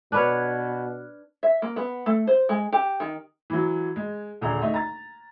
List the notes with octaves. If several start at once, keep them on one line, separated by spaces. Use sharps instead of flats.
B2 D4 B4 C#5 F6 F#6
E5
A#3
B3
A3
C5
G#3
G4
D#3
E3 F#3
G#3
D#1 D3 G#4 A#5
A3 D#4
A#5 A6